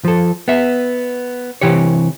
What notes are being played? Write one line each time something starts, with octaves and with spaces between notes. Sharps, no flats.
F3 A4
B3 E5
C3 E3 G4 C#5